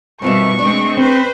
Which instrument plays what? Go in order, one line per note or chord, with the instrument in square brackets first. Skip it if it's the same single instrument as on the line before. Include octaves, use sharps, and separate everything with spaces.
[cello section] B2 D#3 G3 [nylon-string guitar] C4 F4 E5 [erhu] C#6
[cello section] G#3 A3 C4 [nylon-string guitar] D4
[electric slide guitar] C4 [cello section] B4 C5